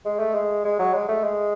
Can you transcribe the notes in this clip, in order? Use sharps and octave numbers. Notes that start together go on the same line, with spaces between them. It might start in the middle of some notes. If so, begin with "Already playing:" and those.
G#3
A3
G#3
G#3
F#3
G#3
A3
G#3